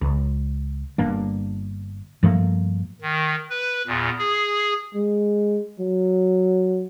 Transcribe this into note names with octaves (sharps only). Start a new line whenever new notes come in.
C#2
G1 G2 A#3 D4
G2 F3 A3 A#3
D#3
B4
E2 A#2
G#4
G#3
F#3